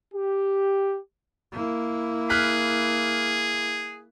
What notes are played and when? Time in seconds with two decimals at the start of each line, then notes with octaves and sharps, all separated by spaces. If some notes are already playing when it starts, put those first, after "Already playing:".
0.14 G4
1.52 A#3 E4
2.30 G#4 F6 F#6 B6